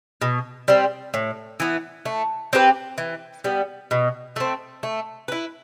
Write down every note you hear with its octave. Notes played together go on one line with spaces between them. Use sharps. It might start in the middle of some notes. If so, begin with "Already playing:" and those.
B2
G3 C4
A2
E3 B3
A3
C4 G4 B4
E3
G3 B3
B2
A3 C4
A3
E4 B4